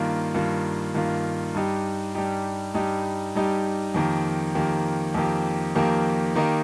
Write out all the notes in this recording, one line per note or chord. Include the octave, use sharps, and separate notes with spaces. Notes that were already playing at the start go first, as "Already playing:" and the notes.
Already playing: G2 D#3 A#3 F4
G2 D#3 A#3 F4
G2 D#3 A#3 F4
G2 G3 D#4 G4
G2 G3 D#4 G4
G2 G3 D#4 G4
G2 G3 D#4 G4
F2 D#3 A#3 G4
F2 D#3 A#3 G4
F2 D#3 A#3 G4
F2 D#3 A#3 G4
D#3 A#3 D#4 G4